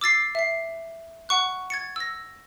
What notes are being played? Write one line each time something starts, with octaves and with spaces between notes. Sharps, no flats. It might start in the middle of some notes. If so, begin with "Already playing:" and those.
D6 E6 A6 C7
E5 C7
F#5 C#6 F#6
G#6 A6 C#7
E6 A#6